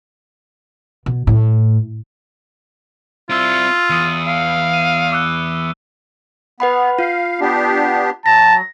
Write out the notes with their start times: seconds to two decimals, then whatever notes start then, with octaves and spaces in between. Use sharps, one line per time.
1.06 B2
1.27 A2
3.30 C4 E4 F4 E6 D#7
3.90 E2 D#6 D#7
4.27 F5
4.74 D#7
5.12 D6 E6 F#6
6.60 B3 B4 F#5 B5
6.99 F4 F5
7.41 B3 D4 G4
8.26 F#3 A5 A#6